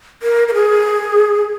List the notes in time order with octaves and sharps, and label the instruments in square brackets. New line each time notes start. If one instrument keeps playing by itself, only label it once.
[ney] A#4
A#4
G#4